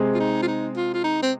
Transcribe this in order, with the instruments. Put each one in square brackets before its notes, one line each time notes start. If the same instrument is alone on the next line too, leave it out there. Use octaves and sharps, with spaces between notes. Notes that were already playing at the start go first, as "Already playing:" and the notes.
Already playing: [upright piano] C3 G#3 C4 G#4
[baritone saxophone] F4
D#4
F4
D#4
F4
F4
D#4
C4